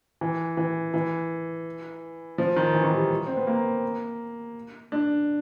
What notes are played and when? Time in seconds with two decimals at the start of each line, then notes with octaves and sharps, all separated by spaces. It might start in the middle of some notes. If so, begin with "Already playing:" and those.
0.21 E3
0.57 E3
0.94 E3
2.38 F3
2.56 D#3
2.74 E3
2.84 D#3
2.93 G3
3.27 C4
3.37 B3
3.47 A#3
4.92 D4